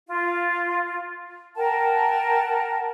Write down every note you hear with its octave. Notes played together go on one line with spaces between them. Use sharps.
F4
A#4 F#5 G5 A5